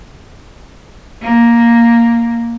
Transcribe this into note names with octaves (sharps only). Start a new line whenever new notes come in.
A#3